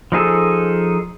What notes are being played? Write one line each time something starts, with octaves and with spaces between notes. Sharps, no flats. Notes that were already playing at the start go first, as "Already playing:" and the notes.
F3 D#4 G#4 A4